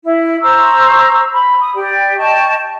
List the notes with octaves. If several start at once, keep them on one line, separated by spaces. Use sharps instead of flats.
E4
C5 A#5 C#6 E6
B5
D#6
G4 D5 G5
D#5 G5 A5 C#6